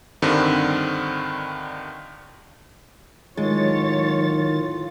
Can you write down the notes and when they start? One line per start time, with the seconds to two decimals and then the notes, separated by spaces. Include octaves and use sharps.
0.22 G2 D3 D#3 C4
3.37 A2 D#3 F#3 G#3 F4 C#5 A6